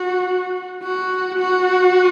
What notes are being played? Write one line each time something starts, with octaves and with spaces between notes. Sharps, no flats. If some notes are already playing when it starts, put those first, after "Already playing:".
Already playing: F#4
F#4
F#4